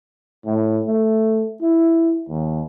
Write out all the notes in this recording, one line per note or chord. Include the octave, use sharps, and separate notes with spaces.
A2
A3
E4
D#2